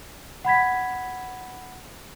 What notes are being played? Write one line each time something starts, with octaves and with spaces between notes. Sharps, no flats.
F#5 B5 G#6 B6